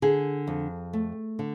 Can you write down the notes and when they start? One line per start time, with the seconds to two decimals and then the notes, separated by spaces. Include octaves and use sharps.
0.02 D3 G#4
0.47 F2
0.93 A3
1.39 D3